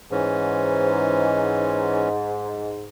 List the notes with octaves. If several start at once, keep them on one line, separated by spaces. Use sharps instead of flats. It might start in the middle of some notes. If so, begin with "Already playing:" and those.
G#2 E3 C#4